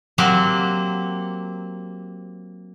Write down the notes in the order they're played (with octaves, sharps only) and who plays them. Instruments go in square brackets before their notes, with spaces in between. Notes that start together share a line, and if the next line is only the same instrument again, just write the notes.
[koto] F#3 A#3 C4 G4 C5 F#5